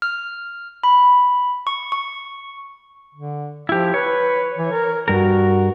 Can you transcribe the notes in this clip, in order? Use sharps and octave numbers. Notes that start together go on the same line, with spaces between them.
F6
B5
C#6
C#6
D3
F3 E4 G4
B4 C#5
E3
A#4
G2 F#4 A#4